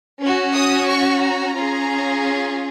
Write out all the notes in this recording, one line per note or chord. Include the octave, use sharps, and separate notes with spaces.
C#4 F#4
D#6
C#6
A#5
C#4 F4 G#4